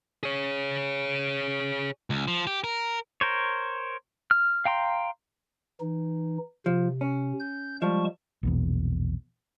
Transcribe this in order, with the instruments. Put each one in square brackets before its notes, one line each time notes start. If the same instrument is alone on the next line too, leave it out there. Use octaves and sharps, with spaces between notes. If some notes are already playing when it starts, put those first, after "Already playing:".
[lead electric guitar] G#4 C#5
[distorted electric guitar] C#2
F3
G4
A#4
[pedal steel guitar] A#4 C5 C#5
F6
F5 G5 A#5 C6
[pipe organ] E3 D#4
[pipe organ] C3 [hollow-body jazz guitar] F3
[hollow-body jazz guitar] C#4
[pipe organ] G6
[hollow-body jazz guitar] F3 G3 [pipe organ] G#3 A5 C#6
[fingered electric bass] A#1 E2 B2